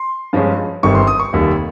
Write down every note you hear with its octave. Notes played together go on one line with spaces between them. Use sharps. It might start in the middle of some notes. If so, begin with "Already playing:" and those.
Already playing: C6
G2 F3 G#3 C#4
G1 G2 D#3 G3 C4 C#6
C6
D#6
C#6
F1 D#2 D#3 G3